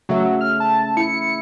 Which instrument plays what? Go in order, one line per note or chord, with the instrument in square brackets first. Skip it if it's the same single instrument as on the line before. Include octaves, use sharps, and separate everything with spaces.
[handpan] C#3 A3 E5 [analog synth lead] F#3
[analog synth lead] F6
A5
[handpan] E4 [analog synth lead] C#7